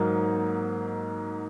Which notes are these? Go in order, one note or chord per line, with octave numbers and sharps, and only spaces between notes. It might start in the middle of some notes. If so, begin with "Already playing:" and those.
Already playing: G#2 F#3 A#3 D#4